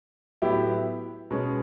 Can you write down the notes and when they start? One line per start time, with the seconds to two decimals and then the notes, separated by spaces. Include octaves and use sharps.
0.42 A2 F#3 B3 E4 G4
1.31 B2 G#3 C#4